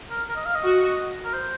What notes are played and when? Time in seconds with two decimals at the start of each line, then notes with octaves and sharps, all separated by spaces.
0.10 A#4
0.29 A#4
0.36 D#5
0.46 F5
0.55 D#5
0.64 F#4
1.25 A#4
1.33 C5